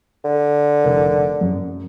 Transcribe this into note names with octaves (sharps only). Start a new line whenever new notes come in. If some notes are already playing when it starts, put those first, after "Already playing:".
D3
F1 A#4
F#2